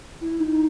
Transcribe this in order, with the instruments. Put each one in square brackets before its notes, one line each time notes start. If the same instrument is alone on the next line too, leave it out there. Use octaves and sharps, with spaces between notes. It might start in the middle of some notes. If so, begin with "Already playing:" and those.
[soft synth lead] E4
D#4